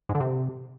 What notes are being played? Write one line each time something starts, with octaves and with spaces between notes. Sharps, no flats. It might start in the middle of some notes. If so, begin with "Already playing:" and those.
G#2
D3
C3